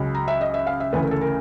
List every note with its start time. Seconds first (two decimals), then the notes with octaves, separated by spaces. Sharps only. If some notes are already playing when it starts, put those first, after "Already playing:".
Already playing: C#2 C#3 F#3
0.15 A#5
0.28 E5
0.41 D#5
0.54 E5
0.67 F5
0.80 E5
0.93 D2 C#3 E3 A3 B4
1.02 A#4
1.11 A4
1.21 A#4